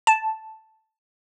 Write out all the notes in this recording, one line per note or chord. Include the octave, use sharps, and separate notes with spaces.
A5